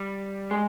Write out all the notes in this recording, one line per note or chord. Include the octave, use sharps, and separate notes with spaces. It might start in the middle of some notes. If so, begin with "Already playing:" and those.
Already playing: G3
G#3